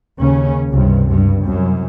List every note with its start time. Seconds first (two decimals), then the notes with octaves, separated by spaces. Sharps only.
0.19 D#2 C#3 C#4
0.69 C#2 G2 C3
1.09 G2
1.41 C2 F#2